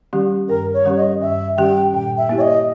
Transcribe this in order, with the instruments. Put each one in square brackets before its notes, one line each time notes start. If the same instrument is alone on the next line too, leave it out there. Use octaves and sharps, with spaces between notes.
[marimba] D#3 G3 C#4 G4
[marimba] G2 [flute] A#4
[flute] C#5
[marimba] D#3 G3 C#4 G4
[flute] D#5
[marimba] G2 [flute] E5
[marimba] D#3 G3 C#4 G4 [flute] G5
[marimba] A#2 [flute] G5
[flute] E5
[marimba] A#3 E4 G4
[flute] C#5
D#5